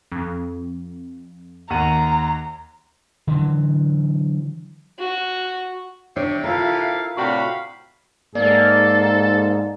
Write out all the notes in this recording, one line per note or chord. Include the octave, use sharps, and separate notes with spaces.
F2
D#2 F#5 A#5 D#7
D3 E3 F#3
F#4
C3 D4 C#5 G5
E4 F4 A4 A#4 F5
A2 C3 D4 F#4 F5 B5
G#2 A#3 A4 D5